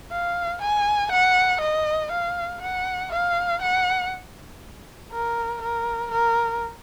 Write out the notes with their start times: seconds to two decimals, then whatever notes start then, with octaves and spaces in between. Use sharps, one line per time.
0.12 F5
0.62 G#5
1.12 F#5
1.61 D#5
2.12 F5
2.62 F#5
3.12 F5
3.62 F#5
5.12 A#4
5.62 A#4
6.12 A#4